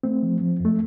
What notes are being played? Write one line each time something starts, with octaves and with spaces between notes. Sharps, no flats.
A3 C4
F3
F3
F2 A3